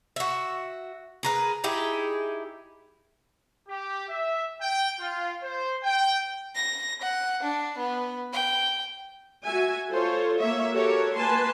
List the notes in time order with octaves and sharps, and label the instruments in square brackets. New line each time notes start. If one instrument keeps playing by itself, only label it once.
[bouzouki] F#4 E5
G#4 A#4 B4
D#4 E4 G4 G#4
[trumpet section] G4
E5
G5
F4
C5
G5
[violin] A#6
F#5
D4
B3
G5
[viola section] F#4 E5 G#5
F4 A4 C5 C#5
A#3 C#5 E5
F#4 G4 A4 A#4 C#5
A#3 B4 G#5 A5 C6